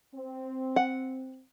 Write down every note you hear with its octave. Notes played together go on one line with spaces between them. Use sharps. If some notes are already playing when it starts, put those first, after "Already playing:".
C4
F#5